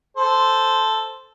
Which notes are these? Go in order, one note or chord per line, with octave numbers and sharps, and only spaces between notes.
A4 C5